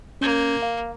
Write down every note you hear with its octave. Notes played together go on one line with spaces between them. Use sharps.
A#3 C#4 G6 G#6
F5